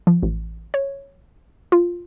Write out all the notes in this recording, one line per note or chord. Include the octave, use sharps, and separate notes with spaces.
F3
A1
C#5
F4